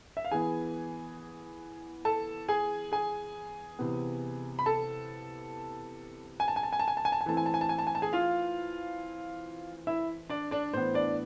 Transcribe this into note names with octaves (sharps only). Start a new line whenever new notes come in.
E5
F5
E3 B3 G#4 G#5
A4 A5
G#4 G#5
G#4 G#5
C3 E3 B3
B5
A4 A5
G#5
A5
G#5
A5
G#5
A5
G#5
A5
G#5
A5
G#5
E3 A3 C4 A5
G#5
A5
G#5
A5
G#5
A5
G#5
A5
G#4 G#5
F4 F5
E4 E5
D4 D5
D4 D5
A2 E3 B3 C5
D4 D5